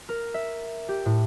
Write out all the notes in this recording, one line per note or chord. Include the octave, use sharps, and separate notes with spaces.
A#4
E5
G4
A2